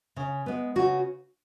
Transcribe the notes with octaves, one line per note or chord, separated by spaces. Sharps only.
C#3
G#3 B3
C#3 F#4